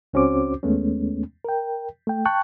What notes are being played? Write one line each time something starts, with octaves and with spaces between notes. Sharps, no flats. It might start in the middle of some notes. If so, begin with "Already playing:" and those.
C#2 C4 C#4 F#4 C5 D6
D#2 G#3 A3 B3 C#4
A#4 G5
A3 G5
G5 A5 C#6 F#6